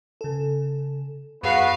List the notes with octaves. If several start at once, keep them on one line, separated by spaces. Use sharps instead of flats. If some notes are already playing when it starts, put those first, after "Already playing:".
C#3 A4
F#2 B3 F#4 G#4 B4 F5 C7